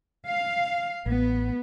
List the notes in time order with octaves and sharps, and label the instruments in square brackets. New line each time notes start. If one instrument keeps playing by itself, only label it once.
[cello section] F5
[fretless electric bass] A1 [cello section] B3